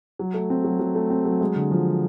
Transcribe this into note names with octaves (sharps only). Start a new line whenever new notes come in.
F#3
A3
C4
F#3
F#3
A3
C4
F#3
G#3
D3
F3